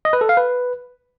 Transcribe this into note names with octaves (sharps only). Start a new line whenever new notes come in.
D#5
B4
A4
F5
B4